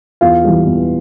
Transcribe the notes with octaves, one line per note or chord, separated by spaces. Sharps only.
E2 F4 F5
E3 G3
E2